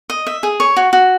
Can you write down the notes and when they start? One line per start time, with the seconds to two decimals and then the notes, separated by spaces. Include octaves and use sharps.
0.10 D#5
0.27 E5
0.43 G#4
0.60 C#5
0.77 F#4
0.93 F#4